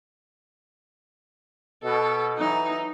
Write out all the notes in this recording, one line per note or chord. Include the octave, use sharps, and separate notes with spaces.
B2 A4
E3 F#3 D#4